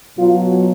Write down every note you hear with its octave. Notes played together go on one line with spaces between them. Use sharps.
B2 F#3 F4